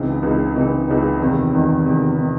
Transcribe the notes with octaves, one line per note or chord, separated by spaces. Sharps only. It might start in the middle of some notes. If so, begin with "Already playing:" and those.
Already playing: C#2 C#3 E3 C4 D#4
C#2 C#3 E3 C4 D#4
C#2 C#3 E3 C4 D#4
C#2 C#3 E3 C4 D#4
E2 C3 D#3
E2 C3 D#3
E2 C3 D#3
C3 D#3